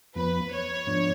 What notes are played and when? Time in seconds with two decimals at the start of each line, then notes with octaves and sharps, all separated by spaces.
0.15 F2 F3 B3 B4
0.52 C#5
0.87 G#2 F3 B3 D4